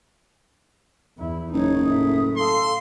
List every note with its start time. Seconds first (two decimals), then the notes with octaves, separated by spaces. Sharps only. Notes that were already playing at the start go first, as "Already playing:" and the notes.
1.18 E2 E4
1.53 F#1 D#4 C#5
1.85 A2 E5 D#6
2.37 A4 F5 A5 C6